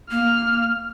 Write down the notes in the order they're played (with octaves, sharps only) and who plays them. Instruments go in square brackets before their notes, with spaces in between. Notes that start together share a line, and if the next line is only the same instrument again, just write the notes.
[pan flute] A#3 [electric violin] F6